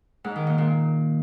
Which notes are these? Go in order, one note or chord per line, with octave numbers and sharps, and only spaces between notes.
G#2
D#3
A#2
A#2